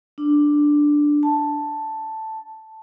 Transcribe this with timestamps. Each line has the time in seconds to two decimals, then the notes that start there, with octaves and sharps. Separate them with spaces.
0.18 D4
1.23 A5